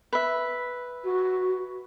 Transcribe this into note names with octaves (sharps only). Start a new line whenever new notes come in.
B4 E5
F#4